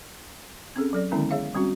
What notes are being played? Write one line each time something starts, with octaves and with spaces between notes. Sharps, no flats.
C4 C#4 G#4 A4
F#3 A4 D5
D3 D#3 G#3 B3 C#4 E4
G#4 C#5 E5 F5
G3 C4 C#4 F#4